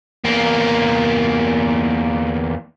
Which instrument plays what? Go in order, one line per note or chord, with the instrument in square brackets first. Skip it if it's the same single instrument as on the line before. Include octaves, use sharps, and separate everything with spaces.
[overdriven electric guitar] E2 A#3